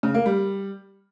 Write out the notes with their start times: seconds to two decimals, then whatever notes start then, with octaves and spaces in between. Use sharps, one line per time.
0.03 C#3
0.14 A#3
0.26 G3